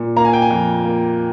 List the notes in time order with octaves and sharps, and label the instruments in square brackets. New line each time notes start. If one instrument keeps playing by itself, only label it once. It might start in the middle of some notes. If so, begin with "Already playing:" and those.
Already playing: [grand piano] A#2
A#3 A#5
G#5
G5
G#5
F2
A#3